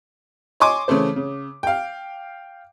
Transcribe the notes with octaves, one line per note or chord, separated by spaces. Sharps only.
C#5 D#5 G#5 C6 D6
C#3 E3 A3 C5
C#3
F5 G5